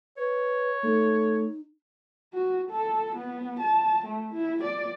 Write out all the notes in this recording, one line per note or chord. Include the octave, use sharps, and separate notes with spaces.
B4 C#5
A3 D#4
F#4
A4
B3
A5
A3
E4
D5